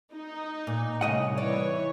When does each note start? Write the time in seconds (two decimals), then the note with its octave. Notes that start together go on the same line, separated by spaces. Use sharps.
0.13 D#4
0.67 A#2
1.01 C2 A2 C#3 D#5 F#5
1.38 E3 C#5 D5